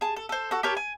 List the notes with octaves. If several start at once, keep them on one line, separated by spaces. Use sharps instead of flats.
G#4 A5
A4
A4 C5
F#4 A4
G4 A4 A#4 C#5
G#5